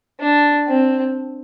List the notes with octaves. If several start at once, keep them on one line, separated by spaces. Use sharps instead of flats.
D4
C4